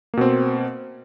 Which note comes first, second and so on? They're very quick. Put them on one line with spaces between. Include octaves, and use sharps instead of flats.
A#3 B2 C4